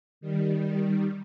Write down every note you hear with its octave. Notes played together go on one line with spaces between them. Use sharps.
D#3 G3